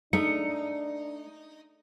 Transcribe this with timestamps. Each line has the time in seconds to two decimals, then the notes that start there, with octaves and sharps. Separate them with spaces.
0.13 A3 D4 D#4 C#7